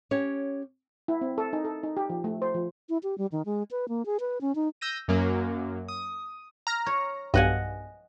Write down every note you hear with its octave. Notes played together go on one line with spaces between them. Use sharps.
C#4 G4 C#5
E4
C4
A4
D#4
A4
D#4
G4
F3
A3
C5
F3
E4
G4
G3
D#3
G#3
B4
A#3
G#4
B4
C#4
D#4
E6 G6 A#6 D#7
F#2 F#3 A#3
D#6
A#5 F6 A#6
C#5
B1 G2 D#5 F#5 G#5